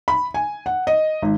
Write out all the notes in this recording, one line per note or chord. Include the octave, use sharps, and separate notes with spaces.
B5
G#5
F#5
D#5
G#1